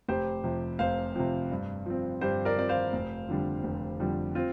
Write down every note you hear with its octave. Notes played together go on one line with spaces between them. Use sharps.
F1 G4 C5
F2 C3
F1 C5 F5
F2 C3
G2
F3 C4
G2 G4 C5
A#4 D5
F3 C4 D5
C5 F5
F1
F2 D3 G3
F1
F2 D3 G3
C4 F4